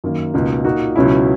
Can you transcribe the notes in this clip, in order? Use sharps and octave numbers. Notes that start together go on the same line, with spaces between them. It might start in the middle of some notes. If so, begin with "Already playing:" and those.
F#2 D#3 A#3
C#2 B2 A#3 D#4
A#2 A#3 D#4 F#4
C#2 B2 F#3 C#4 E4